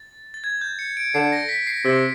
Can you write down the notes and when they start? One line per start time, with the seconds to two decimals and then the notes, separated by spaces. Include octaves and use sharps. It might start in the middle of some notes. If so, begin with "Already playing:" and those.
Already playing: A6
0.34 A6
0.44 G#6
0.61 G6
0.79 C#7
0.97 D7
1.14 D3 C7
1.32 A#6
1.49 B6
1.67 C7
1.84 C3